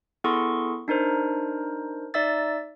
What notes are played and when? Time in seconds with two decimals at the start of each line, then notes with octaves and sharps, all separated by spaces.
0.24 B3 E4 G#4 A4 C6 C#6
0.88 D4 D#4 A#4 C5
2.14 D#4 D5 E5 E6 A6